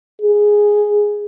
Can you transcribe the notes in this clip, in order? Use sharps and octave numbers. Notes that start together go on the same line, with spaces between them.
G#4